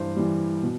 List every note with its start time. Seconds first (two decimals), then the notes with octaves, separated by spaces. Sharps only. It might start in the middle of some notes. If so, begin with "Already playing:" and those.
Already playing: G2 E3 C5
0.16 E3 G3
0.63 B2